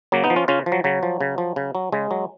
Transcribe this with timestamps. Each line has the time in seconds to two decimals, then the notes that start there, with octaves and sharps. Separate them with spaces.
0.12 C#3 F#3 A#3
0.24 B3 D#4
0.30 F3
0.36 C#4 F4
0.48 C#3 C#4 F4
0.66 F3
0.72 F#3
0.84 C#3 F#3
1.03 F3
1.21 C#3
1.38 F3
1.56 C#3
1.75 F#3
1.92 C#3 G#3
2.11 F#3